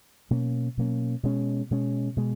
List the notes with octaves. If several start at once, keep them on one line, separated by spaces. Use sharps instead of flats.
B2 F#3 A#3 C#4
B2 F#3 A#3 C#4
B2 G#3 C#4
B2 G#3 C#4
B2 G#3